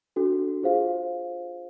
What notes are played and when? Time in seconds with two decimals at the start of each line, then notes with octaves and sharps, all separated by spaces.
0.16 D4 F#4 A4
0.62 F4 G#4 C5 F5